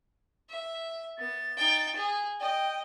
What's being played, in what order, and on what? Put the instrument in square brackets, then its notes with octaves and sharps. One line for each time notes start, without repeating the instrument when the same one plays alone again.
[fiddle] E5
[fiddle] B3 [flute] A6
[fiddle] D#4 G5
G#4
[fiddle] D#5 [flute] G5